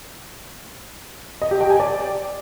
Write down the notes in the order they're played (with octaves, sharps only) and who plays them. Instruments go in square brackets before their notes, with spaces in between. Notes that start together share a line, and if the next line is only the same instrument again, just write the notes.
[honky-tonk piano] D#5
G4
G5
G#5
D5